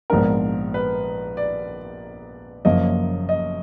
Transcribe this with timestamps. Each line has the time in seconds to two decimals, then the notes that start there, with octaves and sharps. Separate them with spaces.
0.10 A#1 G#2 F3 B3 D4 A#4
0.74 B4
1.37 D5
2.65 F#1 F#2 F3 A#3 D#5
3.29 D#5